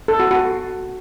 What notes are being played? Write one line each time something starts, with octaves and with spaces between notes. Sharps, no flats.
A4
F#4
F#4